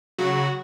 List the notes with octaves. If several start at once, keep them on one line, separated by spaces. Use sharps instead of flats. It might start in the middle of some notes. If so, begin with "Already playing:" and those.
C#3 F#3 F#4